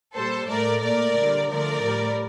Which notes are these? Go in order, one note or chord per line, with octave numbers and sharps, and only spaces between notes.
A#2 G3 A4 C5
A2 A3 A#4 D5
A#2 A3 A#4 D5
D3 G3
D3 F3 A3 A#4 D5
A2 G3